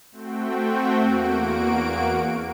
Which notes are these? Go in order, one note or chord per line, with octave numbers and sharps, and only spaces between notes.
A3 C4 F#4 G5
E2 A#3 F#4 D7